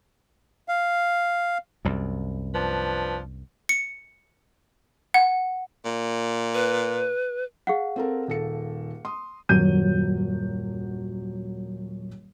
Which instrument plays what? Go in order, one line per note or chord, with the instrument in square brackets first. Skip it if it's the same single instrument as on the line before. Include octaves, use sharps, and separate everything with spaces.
[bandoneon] F5
[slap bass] C2 F#2
[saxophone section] F3 D4 B4
[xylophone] C#7
F#5
[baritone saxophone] A#2
[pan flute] B4
[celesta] G#4 F5 F#5
[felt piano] C4 A4 A#4
D#1 A4 C#7
C6 D#6
D#1 F#2 F#3 G6 D#7